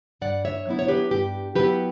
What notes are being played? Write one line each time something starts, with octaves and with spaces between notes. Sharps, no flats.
G2 D5 F#5
C#5 E5
F#3 B3 E4
C#5
G4 B4
G2 G4
F#3 B3 E4 G4 B4